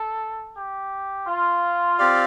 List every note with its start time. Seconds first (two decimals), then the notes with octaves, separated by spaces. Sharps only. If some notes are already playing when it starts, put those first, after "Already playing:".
Already playing: A4
0.56 G4
1.28 F4
1.98 C4 G4 D5 F5